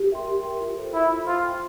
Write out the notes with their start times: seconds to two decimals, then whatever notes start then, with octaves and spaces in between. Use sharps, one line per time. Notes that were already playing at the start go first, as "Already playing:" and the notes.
Already playing: G4
0.10 A#4 E5 G5 C6
0.27 G4
0.44 A#4 E5 G5 C6
0.61 F4
0.77 A4 C5
0.94 E4 F4
1.11 A4 C5
1.27 F4 C5
1.44 G5 C6